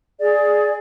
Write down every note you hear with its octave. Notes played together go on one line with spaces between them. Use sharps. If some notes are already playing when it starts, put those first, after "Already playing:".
G#4 D5